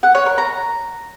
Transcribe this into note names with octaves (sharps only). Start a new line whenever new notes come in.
F#5
C#5
A#4
A#5